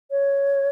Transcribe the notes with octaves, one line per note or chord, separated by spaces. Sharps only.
C#5